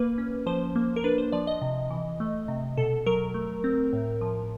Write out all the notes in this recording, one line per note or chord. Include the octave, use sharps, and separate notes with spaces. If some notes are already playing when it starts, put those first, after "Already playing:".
Already playing: A#3 B4
C#4
F3 C5
A#3
A#4
D4 B4
C5
F3 D5
D#5
C3
E3
A3
C3
B2 A4
F#3 A#4
A3
C4
A2
F3